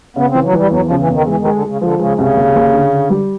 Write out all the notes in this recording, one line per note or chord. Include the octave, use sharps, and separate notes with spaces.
C#3 B3
E3 C4
F#3
E3 G3
E2 F#3
F3
C#3
E3
E2 D#3
E3 G#3
D#3
G#3
D3
C#3 G#3
D3 F3
C#3 G#3
C2 C#3
D#2
D#2
D3
D3
G3